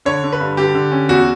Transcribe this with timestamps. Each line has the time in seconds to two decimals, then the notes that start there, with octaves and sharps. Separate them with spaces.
0.05 D3 C#5
0.23 D3
0.32 B4
0.41 G2
0.57 D3 G4
0.75 D3
0.92 C#4
1.09 E2 F#4